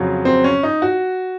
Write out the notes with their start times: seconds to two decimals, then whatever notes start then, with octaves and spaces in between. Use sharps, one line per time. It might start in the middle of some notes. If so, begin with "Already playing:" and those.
Already playing: F2 C#3 F#3
0.25 C4
0.44 C#4
0.63 D#4
0.82 F#4